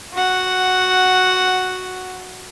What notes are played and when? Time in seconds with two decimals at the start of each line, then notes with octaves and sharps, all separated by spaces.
0.13 F#4 F#5